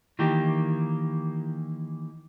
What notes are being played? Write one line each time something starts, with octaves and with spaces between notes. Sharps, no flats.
D#3 E3 A#3 G4